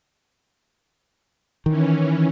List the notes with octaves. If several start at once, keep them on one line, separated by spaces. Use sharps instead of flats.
D#3 E3 C#4